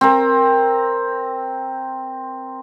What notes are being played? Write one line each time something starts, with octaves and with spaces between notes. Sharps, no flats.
C4 A#4